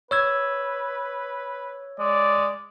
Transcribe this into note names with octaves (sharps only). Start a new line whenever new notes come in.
B4 C#5 E6 G#6
G#3 D5